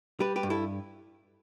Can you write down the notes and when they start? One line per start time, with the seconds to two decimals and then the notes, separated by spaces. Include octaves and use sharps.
0.20 G3 G4 B4
0.36 G4 B4
0.43 G2
0.50 E4 A4